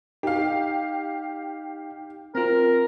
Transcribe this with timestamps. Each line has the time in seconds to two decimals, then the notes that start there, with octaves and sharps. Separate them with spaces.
0.23 D#4 G4 F5
2.35 C4 F4 A#4